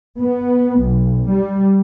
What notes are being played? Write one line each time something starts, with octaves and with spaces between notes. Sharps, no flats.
B3
B1
G3